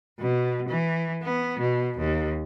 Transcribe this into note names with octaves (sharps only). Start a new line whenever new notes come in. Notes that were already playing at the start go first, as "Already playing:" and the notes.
B2
E3
B3
B2
D#2